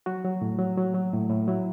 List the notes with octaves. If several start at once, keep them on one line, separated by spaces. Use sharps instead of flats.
F#3 F#4
F#3
A2
F#3
F#3
F#3
A2
A2
F#3 E4